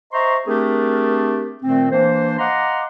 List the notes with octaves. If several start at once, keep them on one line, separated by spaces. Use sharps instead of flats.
C5 D#5 E5 A#5 C6 C#6
A3 C4 D4 G4 G#4 A#4
A#2 D#3 A3 C4
E3 A#3 D4 C5
D#5 F5 F#5 A#5 C6 D6